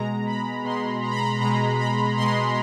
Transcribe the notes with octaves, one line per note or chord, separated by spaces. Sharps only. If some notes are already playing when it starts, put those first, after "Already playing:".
Already playing: B2 G#3 A#5
B5
B2 G#3 C6
A#5
B5
A#5
B2 G#3 A#5
B5
B2 G#3 C6